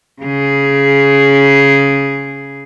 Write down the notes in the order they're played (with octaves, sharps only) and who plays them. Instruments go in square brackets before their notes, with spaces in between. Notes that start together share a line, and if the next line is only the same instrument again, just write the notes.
[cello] C#3 G#4